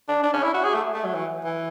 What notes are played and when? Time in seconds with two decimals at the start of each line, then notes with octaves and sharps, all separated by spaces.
0.08 D4
0.23 D4
0.34 C#4
0.43 E4
0.54 F#4
0.64 G#4
0.74 A3
0.94 A3
1.04 F#3
1.14 E3
1.45 E3